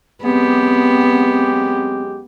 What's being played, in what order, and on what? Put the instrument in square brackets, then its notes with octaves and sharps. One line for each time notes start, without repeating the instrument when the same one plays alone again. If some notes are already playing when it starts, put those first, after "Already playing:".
[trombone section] F#2 G#3 G4 [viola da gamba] B3 [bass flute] C4